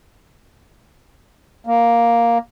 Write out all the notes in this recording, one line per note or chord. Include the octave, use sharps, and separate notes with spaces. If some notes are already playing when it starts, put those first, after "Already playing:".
A#3